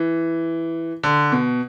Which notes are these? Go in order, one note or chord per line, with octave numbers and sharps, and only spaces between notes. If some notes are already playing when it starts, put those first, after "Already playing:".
Already playing: E3
D3
B2